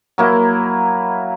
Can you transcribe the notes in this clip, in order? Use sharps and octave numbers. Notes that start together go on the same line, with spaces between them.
F#3 A#3 E4